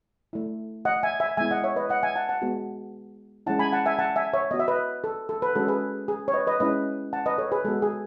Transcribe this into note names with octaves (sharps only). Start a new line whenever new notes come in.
A3 E4
D#5 F#5
E5 G#5
E5 G#5
G#3 B3 E4 E5 G#5
D#5 F#5
C#5 E5
B4 D#5
D#5 F#5
E5 G#5
F#5 A5
F#5 A5
G#3 B3 F#4
G#3 C#4 E4 F#5 A5
G#5 B5
F#5 A5
E5 G#5
F#5 A5
E5 G#5
C#5 E5
B3 F#4 D#5
E5
B4 D#5
A4
A4
B4
G#3 C#4 F#4 A4
G#4 B4
G#4
C#5
B4 D#5
B4 D#5
G#3 C#4 E4 B4 D#5
F#5 A5
B4 D#5
A4 C#5
G#4 B4
G#3 B3 F#4 A4
G#4